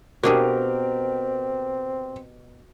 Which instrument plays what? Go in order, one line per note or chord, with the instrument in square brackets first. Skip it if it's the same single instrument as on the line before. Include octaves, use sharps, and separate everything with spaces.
[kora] B2 [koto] A#3 D4 G#4 [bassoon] C4 [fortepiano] G4 A#4